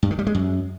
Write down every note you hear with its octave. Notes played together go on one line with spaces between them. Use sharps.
G2
D#3
G3
G#3
F#2